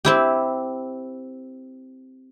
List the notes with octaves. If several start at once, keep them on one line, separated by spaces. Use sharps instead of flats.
C4 E4 G4